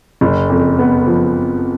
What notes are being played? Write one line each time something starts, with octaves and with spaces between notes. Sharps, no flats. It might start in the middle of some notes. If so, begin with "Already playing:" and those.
F#1
F2
B3
F3